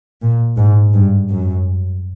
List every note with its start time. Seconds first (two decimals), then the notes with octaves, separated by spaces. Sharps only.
0.21 A#2
0.58 G#2
0.93 G2
1.30 F#2